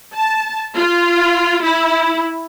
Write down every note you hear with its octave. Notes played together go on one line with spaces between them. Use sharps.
A5
F4
E4